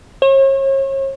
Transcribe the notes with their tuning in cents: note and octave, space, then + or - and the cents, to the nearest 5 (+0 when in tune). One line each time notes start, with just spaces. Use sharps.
C#5 -40